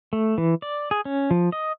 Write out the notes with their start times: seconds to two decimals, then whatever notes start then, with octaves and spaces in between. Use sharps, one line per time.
0.13 A3
0.38 E3
0.62 D5
0.91 G#4
1.05 C#4
1.31 F3
1.52 D#5